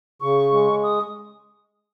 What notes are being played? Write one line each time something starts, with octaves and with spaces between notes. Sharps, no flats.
C#3 C#6
G#3
D#6